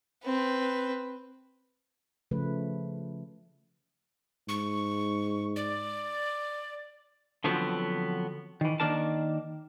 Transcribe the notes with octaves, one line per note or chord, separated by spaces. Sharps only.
C4 B4
C#3 F3 A3 B4
G#2 C#6
D5
D3 F3 F#3 B3 C4
D#3 E3
D#3 G#3 A#3 D4 A#4 A5